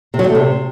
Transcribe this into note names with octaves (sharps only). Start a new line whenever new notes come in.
C3
F#3
G3
A3
C3